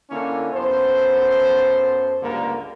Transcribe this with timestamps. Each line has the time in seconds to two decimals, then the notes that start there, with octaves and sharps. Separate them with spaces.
0.11 D3 A#3 C#4 E4 A4
0.53 F#2 B3 A4 C5
2.23 C#2 G2 D3 A#3 A#4